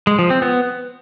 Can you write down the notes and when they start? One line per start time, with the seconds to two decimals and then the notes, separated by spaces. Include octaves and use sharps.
0.07 G#3
0.19 F3
0.30 C4
0.42 B3